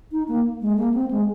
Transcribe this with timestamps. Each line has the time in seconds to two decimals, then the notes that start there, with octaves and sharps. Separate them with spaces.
0.12 D#4
0.28 A#3
0.61 G#3
0.77 A#3
0.94 C4
1.11 G#3